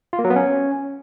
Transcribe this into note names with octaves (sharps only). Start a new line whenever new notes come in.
F4
A#3
F#3
B3
C#4